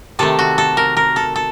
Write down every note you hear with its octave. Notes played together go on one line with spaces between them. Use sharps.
C3 D#3 A3 A4
F#4
A4
A#4
A#4
A4
A4